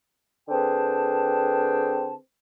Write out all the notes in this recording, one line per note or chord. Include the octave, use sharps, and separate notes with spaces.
D3 C4 G#4 B4 G5 A5